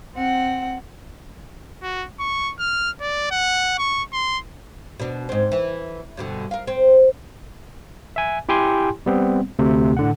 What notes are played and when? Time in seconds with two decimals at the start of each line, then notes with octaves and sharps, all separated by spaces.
0.15 C4 F#5
1.83 F#4
2.20 C#6
2.59 F6
3.01 D5
3.31 F#5
3.78 C#6
4.13 C6
5.00 B2 D4
5.29 G#2 C4
5.52 E3
6.17 G2 B2 D3
6.51 A#4 F5
6.67 C4
8.16 E5 G#5
8.49 E4 G4 G5 G#5 C6
9.06 G3 B3 C4
9.59 D2 C3 A3
9.97 A2 D3 F#5